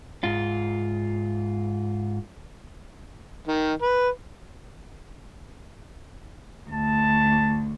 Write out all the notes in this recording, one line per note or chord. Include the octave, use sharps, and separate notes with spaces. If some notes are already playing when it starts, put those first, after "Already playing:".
G#2 F4
D#3
B4
D2 A5